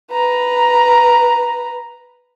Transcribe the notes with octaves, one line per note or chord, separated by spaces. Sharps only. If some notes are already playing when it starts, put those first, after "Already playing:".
B4 A#5